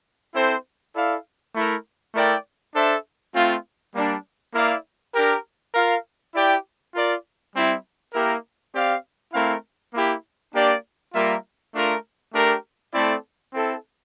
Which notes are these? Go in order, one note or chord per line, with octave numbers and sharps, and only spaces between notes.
C4 E4 A4 C5
E4 A4 D5 F5
A3 E4 A#4
A3 E4 A#4 D5 G5
D4 A4 C5 E5
A3 C4 F4
G3 A#3 D4
A#3 E4 A#4 D5 F5
D4 G4 A#4
F4 A#4 F5
E4 G4 D5 G5
F4 A#4 D5
G3 C4 E4
A#3 E4 G4 A#4
C4 G4 D5 F5
A3 C4 E4 A#4 F5
A#3 E4 G4
A#3 D4 G4 D5
G3 A#3 F4 A#4 E5
A3 D4 F4 A#4
A3 D4 G4 A#4
A3 C4 E4 A4 D5
C4 E4 A4